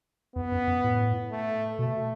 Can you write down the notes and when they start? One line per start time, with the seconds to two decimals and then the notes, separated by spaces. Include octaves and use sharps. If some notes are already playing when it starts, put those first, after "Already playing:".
0.36 E2 B3
0.52 F#2
0.67 F#2
0.84 A2
1.31 A3
1.79 B2 A3